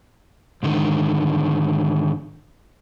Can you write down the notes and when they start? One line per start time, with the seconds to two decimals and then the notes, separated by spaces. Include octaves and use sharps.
0.63 G#2 D3 D#3